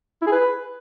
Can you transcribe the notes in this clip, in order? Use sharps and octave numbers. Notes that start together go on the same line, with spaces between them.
E4
G#4
B4